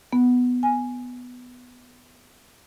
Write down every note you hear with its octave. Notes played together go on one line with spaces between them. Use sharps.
B3
G#5